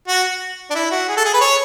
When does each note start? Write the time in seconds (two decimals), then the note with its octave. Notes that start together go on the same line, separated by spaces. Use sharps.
0.08 F#4
0.70 D4
0.75 E4
0.91 F#4
1.09 G#4
1.17 A4
1.25 G#4
1.34 B4
1.41 C#5